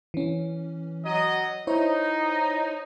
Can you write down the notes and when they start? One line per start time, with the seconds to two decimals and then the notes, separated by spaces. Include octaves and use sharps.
0.14 E3 C#4
1.05 F#3 D#5
1.67 D#4 E4 C5 C#5